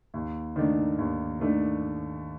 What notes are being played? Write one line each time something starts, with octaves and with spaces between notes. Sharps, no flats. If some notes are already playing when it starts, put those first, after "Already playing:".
D#2
D#3 A3 D4
D#2
D#3 A3 D4